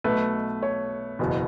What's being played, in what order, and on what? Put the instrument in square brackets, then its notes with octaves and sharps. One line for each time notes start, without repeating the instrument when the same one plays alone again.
[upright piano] B1 B2 A3 [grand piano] B4
[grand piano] C#5
[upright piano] F#1 E2 B2